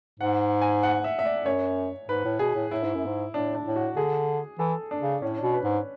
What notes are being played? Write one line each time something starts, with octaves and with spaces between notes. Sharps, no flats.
G#2 F#5
G#5
F#5
E5
E5
D5
F#2 C#5
G#2 B4
A2
B2 G#4
A2
A2 E4
G#2
F#2
G#2
A2 D4
D4
A2
F#4
D3 G#4
E3 A4
D4
C#3
A2 C#4
B2 D4
B4
G#2